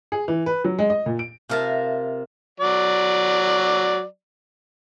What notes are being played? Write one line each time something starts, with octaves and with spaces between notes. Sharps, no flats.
G#4
E3
B4
F#3
G#3
D#5
A#2
D7
C3 F4 A#4 E5 A5
F#3 D5